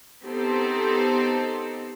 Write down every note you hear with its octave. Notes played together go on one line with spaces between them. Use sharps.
B3 C4 D#4 G4 A4 C5